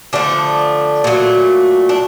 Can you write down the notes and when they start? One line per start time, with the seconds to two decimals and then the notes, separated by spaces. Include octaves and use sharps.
0.13 D3 F3 A3 D4
1.04 A#2 F#3 A3
1.89 D4